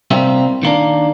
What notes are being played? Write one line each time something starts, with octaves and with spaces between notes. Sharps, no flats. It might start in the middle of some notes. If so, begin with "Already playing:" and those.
C2 C3 G3 A#3 C4 E5
D#3 A#3 D4